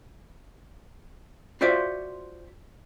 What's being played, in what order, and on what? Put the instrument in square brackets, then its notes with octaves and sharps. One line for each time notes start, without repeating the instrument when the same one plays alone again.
[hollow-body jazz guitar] F4 F#4 C5 D5 E5 F5